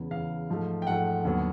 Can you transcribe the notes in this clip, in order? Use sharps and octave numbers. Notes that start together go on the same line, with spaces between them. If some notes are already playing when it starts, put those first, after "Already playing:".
Already playing: E2 C#3 E3
E2 C#3 E3 F5
G#2 F3 A3
G5
G#2 F3 A3 F#5
D#2 D3 F#3 B3